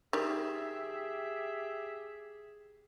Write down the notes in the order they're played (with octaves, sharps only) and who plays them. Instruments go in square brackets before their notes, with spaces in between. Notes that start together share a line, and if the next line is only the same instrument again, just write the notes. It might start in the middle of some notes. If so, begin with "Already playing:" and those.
[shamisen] D#3 G3 [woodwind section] G4 E5 [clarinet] G#4